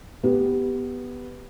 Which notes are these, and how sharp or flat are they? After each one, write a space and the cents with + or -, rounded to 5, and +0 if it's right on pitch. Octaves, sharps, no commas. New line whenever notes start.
B3 +0 G4 +0